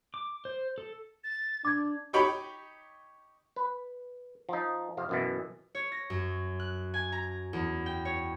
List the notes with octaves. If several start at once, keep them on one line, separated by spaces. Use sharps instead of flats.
D6
C5
A4
A6
D4 D6 G#6
D#4 G4 C#5 G5 B5
B4
F3 D#4
F2 C3 F5
F#2 B2 E3
C#5
A#6
F#2
F#6
G#5
A#5
E2
G5
C#5